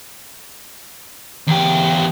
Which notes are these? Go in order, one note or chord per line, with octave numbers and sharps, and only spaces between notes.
E2 G4